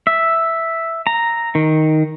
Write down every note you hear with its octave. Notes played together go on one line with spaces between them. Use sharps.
E5
A#5
D#3